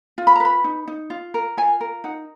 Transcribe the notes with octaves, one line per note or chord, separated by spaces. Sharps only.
F4
B5
A#5
B4 B5
D#4
D#4
F4
A#4
F4 G#5
A#4
D#4 F#5